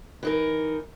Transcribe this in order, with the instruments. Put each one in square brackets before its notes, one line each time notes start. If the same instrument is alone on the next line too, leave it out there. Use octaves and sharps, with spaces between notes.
[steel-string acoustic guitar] E3 D#4 A#4